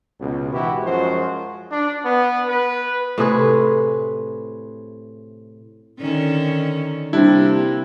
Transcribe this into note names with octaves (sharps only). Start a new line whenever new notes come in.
C#2 B2
G#2 E3 E4 F#4 G4
F#2 F3 G#3 F#4 C5
D4
B3
B4
A2 C3 G#4 B4
D3 D#3 C#4
C3 G3 A#3 C4 D4 E4